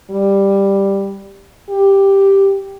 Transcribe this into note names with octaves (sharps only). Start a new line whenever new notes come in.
G3
G4